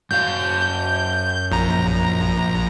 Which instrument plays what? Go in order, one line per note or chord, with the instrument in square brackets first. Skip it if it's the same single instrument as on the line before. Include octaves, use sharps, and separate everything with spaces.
[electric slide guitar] F#2 F#3 F5 [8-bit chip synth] G6
[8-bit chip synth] A#1 A#5